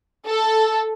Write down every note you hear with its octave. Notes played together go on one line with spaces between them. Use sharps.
A4